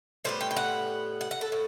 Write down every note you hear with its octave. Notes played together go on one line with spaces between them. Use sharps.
A2 G3 B3 C5
G5
G5
F#5
F#5
F#5
A4
A2